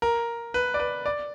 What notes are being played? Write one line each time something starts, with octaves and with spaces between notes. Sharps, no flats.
A#4
B4
D5
B4
D5